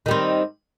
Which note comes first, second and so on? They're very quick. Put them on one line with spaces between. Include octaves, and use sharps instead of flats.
D#3 G3 C4